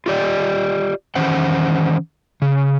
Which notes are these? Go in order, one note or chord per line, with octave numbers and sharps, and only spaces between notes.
F4 G4 D5 D#5
D#3 E3 C#4 C5 F#5
C#3